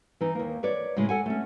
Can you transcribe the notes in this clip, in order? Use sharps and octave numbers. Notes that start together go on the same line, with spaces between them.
E3 D#4
D#2 A#3
B4 C#5 D5
A2 C#3 G#3
A4 F#5 G#5
A3 C#4